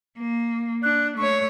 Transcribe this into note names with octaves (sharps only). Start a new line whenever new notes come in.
A#3
D4 F#6
A3 C#5 C#6